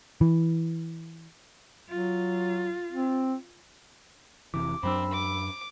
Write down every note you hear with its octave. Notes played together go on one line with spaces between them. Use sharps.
E3
F#3 F4
C4
F1 C3 E3 D6
F#2 F#3 C4 D4 B5 E6
D6